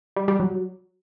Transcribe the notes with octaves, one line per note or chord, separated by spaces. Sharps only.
G3
G3
F#3